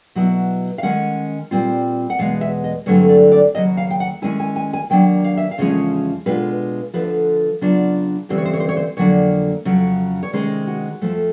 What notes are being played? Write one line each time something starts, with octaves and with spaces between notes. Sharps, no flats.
B2 F#3 B3 E4
F5
D#3 G#3 C#4 F#5
A#2 G3 C4 F4
F#5
E2 B2 G#3 B3 F5
E5
D#5
G2 D3 F#3 A3 C4 C#5
D5
D5
D#2 C#3 F#3 D#5
F5
G5
F#5
D#3 G#3 C#4 E4 G#5
G#5
G#5
G#5
D#3 F#3 A#3 D4 G5
F5
E5
F5
E2 C#3 F3 G#3 C#4
B2 G#3 B3 D4 F4 B4
D2 D3 F3 B4
C#3 F#3 B3 D4 F4
D2 C#3 E3 G3 C4 C5
C#5
C5
C#5
C5
C#5
C5
F2 D3 F#3 A#3 D4 C#5
F2 C#3 F#3
C#5
C3 D#3 G#3 C#4 C5
F#4
F2 C#3 F3 A3